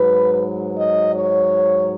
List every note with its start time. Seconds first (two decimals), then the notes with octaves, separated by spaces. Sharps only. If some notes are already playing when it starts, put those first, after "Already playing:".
Already playing: G#2 F#3 B4
0.77 D#5
1.15 C#5